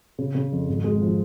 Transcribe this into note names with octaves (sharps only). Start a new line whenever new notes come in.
C#3
C#3
F2
G#1
G#3
F3